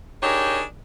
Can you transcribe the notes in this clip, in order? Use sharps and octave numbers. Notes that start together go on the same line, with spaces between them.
D4 D#4 G4 G#4 A#4 C#5